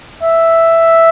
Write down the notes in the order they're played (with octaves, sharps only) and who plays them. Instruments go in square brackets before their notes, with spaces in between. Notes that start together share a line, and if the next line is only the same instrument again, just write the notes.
[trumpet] E5